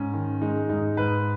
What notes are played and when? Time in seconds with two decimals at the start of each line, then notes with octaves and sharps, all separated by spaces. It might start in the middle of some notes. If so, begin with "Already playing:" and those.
Already playing: G#2 C#4
0.13 D#3
0.41 G#3 D#4
0.69 G#2 D#4
0.97 G#2 B4